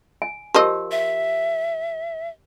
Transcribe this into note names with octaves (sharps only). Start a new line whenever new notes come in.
G#5
F3 G4 A#4 D#5
E5